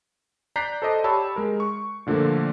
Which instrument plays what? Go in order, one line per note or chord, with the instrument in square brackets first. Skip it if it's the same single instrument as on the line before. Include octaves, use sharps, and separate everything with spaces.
[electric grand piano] D5 A#5 F#6 G6 B6 C7
A4 C5 D5 D#5
G4 C#5 A5 B5 E6
G#3 A#4
C#6
A#2 D3 F3 A3 A#3